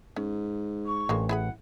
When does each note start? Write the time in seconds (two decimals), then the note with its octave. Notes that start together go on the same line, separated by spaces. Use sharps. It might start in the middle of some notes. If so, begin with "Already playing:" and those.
0.16 G#2 C#4
0.85 C#6
1.09 A1 G#3 A#3 D4
1.29 E4 G#4 F#5 B5